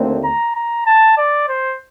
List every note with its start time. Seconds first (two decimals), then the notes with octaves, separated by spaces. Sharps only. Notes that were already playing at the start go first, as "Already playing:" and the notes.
Already playing: D#2 D3 A3 C4
0.24 A#5
0.56 A#5
0.86 A5
1.18 D5
1.49 C5